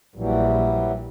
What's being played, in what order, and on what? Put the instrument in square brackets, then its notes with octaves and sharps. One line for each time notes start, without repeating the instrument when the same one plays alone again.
[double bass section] A#1 [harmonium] E3 F#3 G3